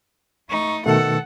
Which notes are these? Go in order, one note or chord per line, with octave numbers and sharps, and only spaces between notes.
A3 D#4 C#6
B2 D#3 A3 A4 F#5